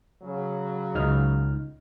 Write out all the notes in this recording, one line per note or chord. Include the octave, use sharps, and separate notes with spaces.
C#3 F#3
C#2 D#4 F6